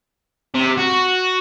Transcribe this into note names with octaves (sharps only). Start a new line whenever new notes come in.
C3
F#4